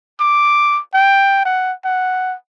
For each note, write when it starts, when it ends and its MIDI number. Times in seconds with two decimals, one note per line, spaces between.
0.20 0.80 86
0.94 1.41 79
1.45 1.72 78
1.85 2.35 78